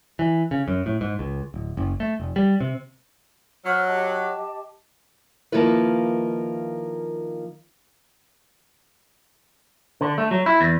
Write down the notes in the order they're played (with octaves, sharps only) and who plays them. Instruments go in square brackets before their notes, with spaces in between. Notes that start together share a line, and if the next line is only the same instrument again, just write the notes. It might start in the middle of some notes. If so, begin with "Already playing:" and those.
[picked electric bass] E3
C#3
F#2
A2
G#2
C#2
D1
F#1
A3
F1
G3
C3
[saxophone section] F#3 [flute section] C5 E6 F6
[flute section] G4 D#5 A5
[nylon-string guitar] D#3 F3 A#3 E4 F4 B4
[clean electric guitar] D3
A3
F#3
E4
E2